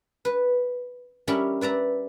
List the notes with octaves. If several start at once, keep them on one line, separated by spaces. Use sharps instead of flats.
B4
G3 C#4 E4 G4 A#4 B5
B4 D5 E5 A#5